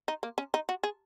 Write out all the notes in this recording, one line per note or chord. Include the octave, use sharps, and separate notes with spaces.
D#4
A#3
C#4
D#4
F#4
G#4